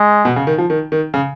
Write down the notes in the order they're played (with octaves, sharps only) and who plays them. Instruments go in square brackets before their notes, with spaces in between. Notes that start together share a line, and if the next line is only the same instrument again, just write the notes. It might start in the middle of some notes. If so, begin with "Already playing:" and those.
Already playing: [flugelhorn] G#3
[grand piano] B2
C#3
D#3
F3
D#3
D#3
C#3